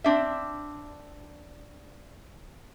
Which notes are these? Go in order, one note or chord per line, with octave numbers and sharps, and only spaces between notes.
C4 D4 E5